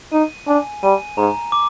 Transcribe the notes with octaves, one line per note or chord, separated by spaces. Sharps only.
D#4 D#7
D4 G#5
G3 D#7
G#2 A#5
D6